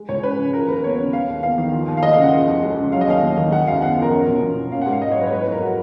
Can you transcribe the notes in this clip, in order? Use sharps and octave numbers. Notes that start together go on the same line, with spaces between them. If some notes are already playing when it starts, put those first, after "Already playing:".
Already playing: G#3
C#2 C#5
C#4 B4
C#3
F3 A#4
D#2 B4
B3 C#5
C#3
G#3 F5
D#2
B3 F5
D#3
F3
D#2
F5
G#3 D#5
F5
C#3
F#5
F3
F2
G#3
C#3
F#3 F5
D#5
D#2 F5
D#2
D#3
G#3 F#5
F#2 F5
B3 F#5
F3
A#4
C#4
B2
B2
A#3
C#4 F5
F#5
G#2
F5
G#2 D#5
C#5
F#3 B4
C#5
G#3 B4
B4
F2 A#4
F#4